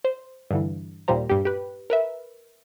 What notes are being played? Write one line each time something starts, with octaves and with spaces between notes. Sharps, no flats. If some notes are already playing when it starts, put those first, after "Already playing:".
C5
G2 D3 E3
D#2 A#2 G3 C5 A#5
G2 G4
G4 B4
A#4 B4 E5